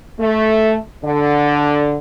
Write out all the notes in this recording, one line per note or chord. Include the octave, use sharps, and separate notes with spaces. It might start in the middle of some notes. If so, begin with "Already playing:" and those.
A3
D3